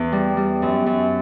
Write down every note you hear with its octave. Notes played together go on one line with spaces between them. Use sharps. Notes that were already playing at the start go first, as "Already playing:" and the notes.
Already playing: E2
G3
G3
F#2
F#2